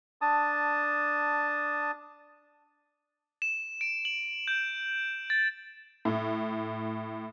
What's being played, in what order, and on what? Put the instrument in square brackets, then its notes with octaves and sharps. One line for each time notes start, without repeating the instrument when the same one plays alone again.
[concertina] D4 A5 D#6
[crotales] E7
D7
F#7
G6
A6
[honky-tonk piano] A2